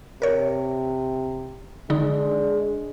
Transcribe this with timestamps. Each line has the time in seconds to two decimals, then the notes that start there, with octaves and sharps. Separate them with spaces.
0.22 C3 A#4 C#5
1.90 D3 G#3 D4 D#4